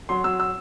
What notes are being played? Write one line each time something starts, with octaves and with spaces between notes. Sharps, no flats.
F#3 C6
F#3 E6
E6